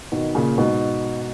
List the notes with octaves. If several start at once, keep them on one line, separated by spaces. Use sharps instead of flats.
B2 D#3
A#2 C#3
G#2 B2